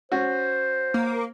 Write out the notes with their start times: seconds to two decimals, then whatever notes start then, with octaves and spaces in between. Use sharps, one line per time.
0.12 C#4 F#4 C5
0.94 A#3